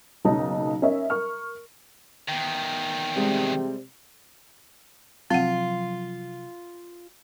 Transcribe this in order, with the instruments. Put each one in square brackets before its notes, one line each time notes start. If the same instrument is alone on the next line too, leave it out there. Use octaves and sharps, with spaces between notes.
[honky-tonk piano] F#1 B1 C#3 C#4 D#4 A5
C#4 A#4 D#5 E5
A#4 C#6 F6
[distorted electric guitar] E2 D#3 [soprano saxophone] G5
[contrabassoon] C3 [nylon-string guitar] G3 G#3 C4
[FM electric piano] C3 F3 F#3 [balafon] C4 F#5 [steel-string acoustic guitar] F4